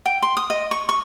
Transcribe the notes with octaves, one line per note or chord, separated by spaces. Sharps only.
G5
C6
D#6
D#5
C#6
C#6